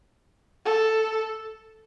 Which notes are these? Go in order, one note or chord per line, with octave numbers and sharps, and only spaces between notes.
A4